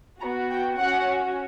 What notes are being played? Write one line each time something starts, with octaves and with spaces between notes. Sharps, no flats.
B3 F#4 A#5
G5
C#4 F#4 F#5